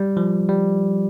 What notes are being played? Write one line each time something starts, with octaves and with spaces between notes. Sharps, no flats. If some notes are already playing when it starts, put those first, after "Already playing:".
Already playing: G3
F3
G3